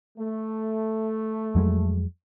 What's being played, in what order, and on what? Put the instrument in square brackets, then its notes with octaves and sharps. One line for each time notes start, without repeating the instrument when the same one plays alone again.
[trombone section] A3
[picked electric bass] F2 F#3 G#3